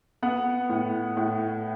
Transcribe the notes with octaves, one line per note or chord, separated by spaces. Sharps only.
B3 F#5
A2
A2